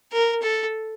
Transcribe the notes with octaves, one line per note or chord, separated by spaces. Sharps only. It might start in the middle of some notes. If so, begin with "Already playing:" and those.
A#4
A4